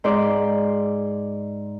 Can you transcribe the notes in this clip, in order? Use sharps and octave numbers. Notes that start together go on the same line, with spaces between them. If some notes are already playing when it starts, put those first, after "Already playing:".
G#2 C5 D5